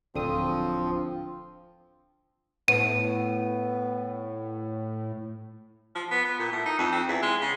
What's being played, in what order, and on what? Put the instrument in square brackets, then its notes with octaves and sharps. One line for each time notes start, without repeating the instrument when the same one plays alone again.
[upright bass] D1 [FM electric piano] D3 D#6 [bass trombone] F3 [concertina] C4
[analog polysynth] A2 [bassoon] B3 [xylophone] D#7
[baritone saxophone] F3
B3
B3
A#2
A2
D#4
F2
C4
E2
G#3
C#3